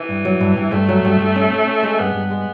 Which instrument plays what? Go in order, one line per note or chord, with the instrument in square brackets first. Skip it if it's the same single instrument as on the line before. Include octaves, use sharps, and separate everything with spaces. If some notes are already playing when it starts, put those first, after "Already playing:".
Already playing: [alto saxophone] E3
[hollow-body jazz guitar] G2
F#3
G2
G2
[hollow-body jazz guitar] G2 [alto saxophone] A3
[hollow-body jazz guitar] F#3
G2
G2
C#4
C#4
C#4
G#3
[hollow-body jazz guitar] G2 [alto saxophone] B3
[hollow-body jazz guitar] G2
G#3